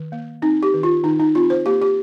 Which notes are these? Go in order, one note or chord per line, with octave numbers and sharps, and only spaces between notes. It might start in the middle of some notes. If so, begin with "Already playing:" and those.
Already playing: D#3
A#3
C4 D#4
G4
D#3
F4
D#3 D#4
D#4
C4 F4
C5
A#3 G4
G4